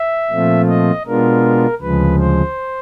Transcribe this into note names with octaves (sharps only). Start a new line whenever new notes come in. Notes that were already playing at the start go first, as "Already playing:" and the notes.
Already playing: E5
A#2 F3 A3 C4 F4
D#5
B2 G#3 B3 D4 F4 A#4
D2 C#3 F3 G#3 B4
C5